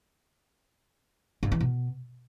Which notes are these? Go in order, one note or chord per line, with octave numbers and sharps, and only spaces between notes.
G2
E3
B2